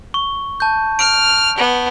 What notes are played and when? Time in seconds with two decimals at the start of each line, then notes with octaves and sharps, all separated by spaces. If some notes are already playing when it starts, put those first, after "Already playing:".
0.14 C#6
0.60 A5 G6
0.99 F6 D7
1.58 B3